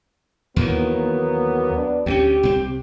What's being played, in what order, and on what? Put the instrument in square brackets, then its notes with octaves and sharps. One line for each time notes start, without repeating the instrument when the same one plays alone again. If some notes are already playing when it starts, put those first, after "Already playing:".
[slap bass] D#2 D#3 E3 [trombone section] F#3 A#3 B3
[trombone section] B3 D4
[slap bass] D2 A#3 C#4 [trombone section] G4
[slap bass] C2 C4